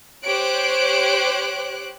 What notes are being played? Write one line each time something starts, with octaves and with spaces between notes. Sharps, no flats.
G4 C5 C#5 F#6 D7